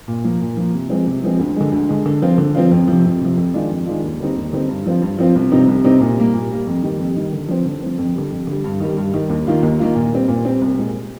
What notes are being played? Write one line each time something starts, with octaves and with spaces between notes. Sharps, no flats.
A#2
F3 A#3
A#2
F3 A#3
C3
F3 G#3 C4
C3
F3 G#3 C4
D2
D3 G#3
D2
D3 G#3
D3
F3 C4 F4
D3
F3 C4 F4
F2
C3 F3
F2
C3 F3
F2
D#3 G#3 D4 F4
F2
D#3 G#3 D4 F4
D#2
D3 G3 C4 D#4
D#2
D3 G3 C4 D#4
G2
F3 C4 F4
G2
F3 C4 F4
C2
C3 G3 C4 D#4
C2
C3 G3 C4 D#4
A#2
G3 A#3
A#2
G3 A#3
F2
D#3 G3
F2
D#3 G3
D3
F3 C4
D3
F3 C4
F2
D3 G3
F2
D3 G3
G2
D#3 G3
G2
D#3 G3
D#2
D#3 A#3 F4
D#2
D#3 A#3 F4
A#2
G3 C4
A#2
G3 C4
C2
A#2 G#3